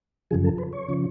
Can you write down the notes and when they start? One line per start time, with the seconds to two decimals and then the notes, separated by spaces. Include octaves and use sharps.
0.31 F#2 C#3 F3 G#4
0.44 A4
0.58 B4
0.73 C#5
0.88 C#3 F3